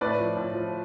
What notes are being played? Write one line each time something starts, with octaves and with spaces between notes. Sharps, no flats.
A2 B4 D5
F3
A2
F3